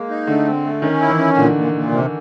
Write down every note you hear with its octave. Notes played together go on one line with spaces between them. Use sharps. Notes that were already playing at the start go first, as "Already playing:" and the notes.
Already playing: G#3 A#3
D#4
D3 A3
C4
A3
D#3 C#4
E4
E3
C#4
A#2 D3
A#2
A#2
C3